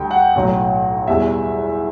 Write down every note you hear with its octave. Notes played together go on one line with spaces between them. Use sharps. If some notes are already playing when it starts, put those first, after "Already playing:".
Already playing: D2 D3 G3 G5
F#5
B1 A2 F#3
E2 B2 G3 E5